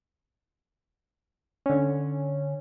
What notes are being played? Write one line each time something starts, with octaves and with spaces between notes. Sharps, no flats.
D3 C#4